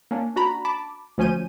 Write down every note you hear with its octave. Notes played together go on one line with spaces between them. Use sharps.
A#3 C#4 D4
D4 F#4 A#5 B5
A5 B5 D6
D2 F3 C#4 G#5 G6 D#7